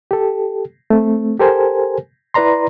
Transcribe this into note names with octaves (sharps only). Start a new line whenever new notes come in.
G4 A4
A3 C4
G4 A4 A#4 C5 G#5
E4 B4 D5 A#5 C6